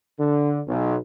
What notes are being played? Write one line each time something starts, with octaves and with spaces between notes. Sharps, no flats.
D3
B1